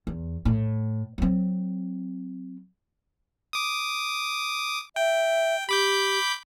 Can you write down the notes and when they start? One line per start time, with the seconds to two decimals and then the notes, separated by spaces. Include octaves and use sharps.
0.07 E2
0.45 A2
1.18 F#3 C4
3.53 D6 D#6
4.96 E5 G5
5.69 G4 B5 D6 G6